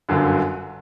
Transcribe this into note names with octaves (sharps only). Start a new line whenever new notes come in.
G1 F#2 D3